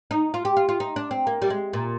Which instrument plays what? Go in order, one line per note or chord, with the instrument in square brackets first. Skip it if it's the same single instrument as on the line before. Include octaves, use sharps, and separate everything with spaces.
[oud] D#4
F4
G4
F4
F4
D#4
D4
C4
A#3
G3
G#3
A#2